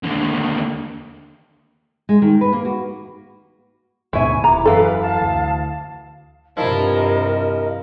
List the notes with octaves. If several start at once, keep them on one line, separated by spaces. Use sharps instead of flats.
D#2 D3
G#3
D#3
B4
A#3
F#4
D2 G#2 B2 E4 E5 G#5 C#6
D#1 A#5 D6
F#2 E3 A4 B4 F5
F5 A5
D2
G2 C3 F3 E4 A#4 D#5